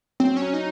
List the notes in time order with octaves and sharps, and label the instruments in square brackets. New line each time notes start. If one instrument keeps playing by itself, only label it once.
[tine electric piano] F#3 [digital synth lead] C4
[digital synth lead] C#4
[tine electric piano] F#3
[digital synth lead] D#4